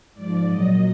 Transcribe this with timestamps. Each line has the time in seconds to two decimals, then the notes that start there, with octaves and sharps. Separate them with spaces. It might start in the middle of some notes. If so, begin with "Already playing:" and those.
0.14 G#2 F3 D5
0.46 A#2 F#3 D#5